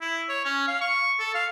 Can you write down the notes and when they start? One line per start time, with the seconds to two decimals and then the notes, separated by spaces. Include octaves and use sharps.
0.01 E4
0.29 C#5
0.45 C#4
0.68 F5
0.81 C#6
1.19 A4
1.35 F5